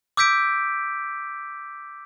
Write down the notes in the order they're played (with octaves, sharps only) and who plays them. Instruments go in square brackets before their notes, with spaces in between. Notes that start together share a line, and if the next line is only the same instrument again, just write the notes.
[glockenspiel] D6 E6 G6 B6 D7